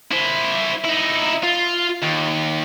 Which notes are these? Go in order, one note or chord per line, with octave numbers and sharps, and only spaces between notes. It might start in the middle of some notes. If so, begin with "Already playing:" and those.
E4 C5
D#4 E4
F4
D#2